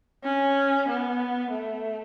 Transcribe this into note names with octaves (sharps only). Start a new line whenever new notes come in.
C#4
B3
A3